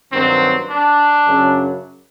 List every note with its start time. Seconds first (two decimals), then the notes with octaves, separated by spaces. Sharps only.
0.12 G2 D#3 F#3 C4
0.70 D4
1.26 F#2 C#3 F#3